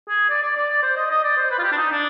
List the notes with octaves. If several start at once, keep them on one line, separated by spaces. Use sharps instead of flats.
G#4
D5
D5
D5
D5
C5
D#5
D#5
D5
C5
B4
F4
G4
D4
D#4
D4